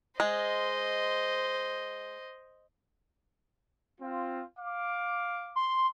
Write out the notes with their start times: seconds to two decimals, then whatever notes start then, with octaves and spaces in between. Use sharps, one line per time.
0.20 G#3 C5 D#5
4.00 C4 F4
4.58 F5 D6
5.56 C6